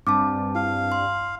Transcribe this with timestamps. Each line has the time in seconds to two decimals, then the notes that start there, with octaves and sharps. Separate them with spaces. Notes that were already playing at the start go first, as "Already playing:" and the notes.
0.07 G2 C4 D4 A5 D6
0.55 E4 F5
0.92 C6